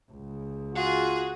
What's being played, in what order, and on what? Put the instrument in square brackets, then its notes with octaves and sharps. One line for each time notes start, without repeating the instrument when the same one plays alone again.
[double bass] C#2
[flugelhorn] F4 [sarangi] F#4 [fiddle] G#4